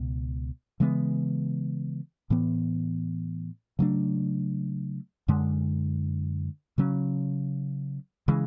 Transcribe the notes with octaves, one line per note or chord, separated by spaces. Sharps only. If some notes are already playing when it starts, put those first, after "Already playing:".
Already playing: C#2 B2
C#3 E3 G#3 B3
A2 E3 B3
C#3 F#3 A3 D4
F#2 D3 G#3
C#3 F#3 C#4
C#3 E3 G#3